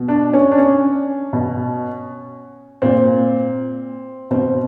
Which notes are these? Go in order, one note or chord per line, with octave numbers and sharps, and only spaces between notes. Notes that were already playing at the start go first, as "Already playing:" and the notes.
Already playing: B2
D4
C#4
D4
C#4
B2
A#2 C4
B2 C4